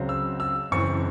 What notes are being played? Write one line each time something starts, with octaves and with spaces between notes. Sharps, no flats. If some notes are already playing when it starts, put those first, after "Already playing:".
Already playing: C#2 C#3 F#3 C4
E6
E6
F#1 F#2 E3 C4 C#6